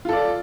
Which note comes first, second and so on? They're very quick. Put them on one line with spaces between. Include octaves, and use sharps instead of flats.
F4 A4 D5